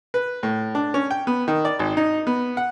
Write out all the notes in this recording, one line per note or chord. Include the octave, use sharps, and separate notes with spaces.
B4
A2
D4
C#4
G5
B3
D#3
D5
G#1
D#4
B3
F#5